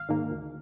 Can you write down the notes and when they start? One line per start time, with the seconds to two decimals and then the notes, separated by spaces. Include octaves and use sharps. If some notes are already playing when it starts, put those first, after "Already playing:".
Already playing: G#1 F5
0.09 G#2 D#3 A#3
0.31 D2